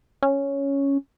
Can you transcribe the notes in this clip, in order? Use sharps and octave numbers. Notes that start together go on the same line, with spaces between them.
C#4